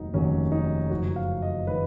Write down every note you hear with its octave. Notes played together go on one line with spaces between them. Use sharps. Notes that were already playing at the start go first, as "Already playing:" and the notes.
Already playing: F1 D#2 D#3 F#3 D#4
F1 D#2 D#3 F#3 C#4
D#4
F#1 F2 D#3 F#3 F#4
F5
D#5
D#3 F#3 B4